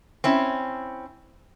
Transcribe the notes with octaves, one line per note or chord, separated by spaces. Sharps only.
C4 C#4 E4